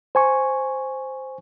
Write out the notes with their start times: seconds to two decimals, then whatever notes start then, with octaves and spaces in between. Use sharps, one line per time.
0.15 C5 G#5 C#6